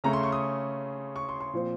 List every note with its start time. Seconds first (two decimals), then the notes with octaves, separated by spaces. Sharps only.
0.04 C#3 A3 C#4 A#5
0.13 C6
0.23 C#6
0.32 D#6
1.16 C#6
1.29 C6
1.40 C6
1.53 A#2 F3 C4